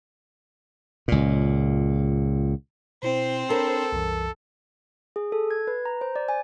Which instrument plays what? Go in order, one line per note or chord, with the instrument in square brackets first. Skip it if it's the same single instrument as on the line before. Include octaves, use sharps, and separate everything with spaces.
[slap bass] C#2 A#2
[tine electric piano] B2 E4 [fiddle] C4 C5
[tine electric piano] D4 C#5 B5 [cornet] A4 [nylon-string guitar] A#4
[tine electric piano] C2 F#2 E3
[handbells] G#4
A4
G#6
B4
A#5
C5
D5
G#5